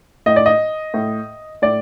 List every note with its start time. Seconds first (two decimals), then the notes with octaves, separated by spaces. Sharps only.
0.26 A2 D#5
0.36 D5
0.46 D#5
0.94 A2
1.62 A2 D5